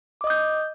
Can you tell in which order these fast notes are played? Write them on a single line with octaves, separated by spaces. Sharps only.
D6 D#5 D#6 G6